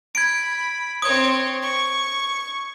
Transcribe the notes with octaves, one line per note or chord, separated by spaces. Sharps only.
B5 G#6 D7
C4 C#5 D#6 G#6
C#6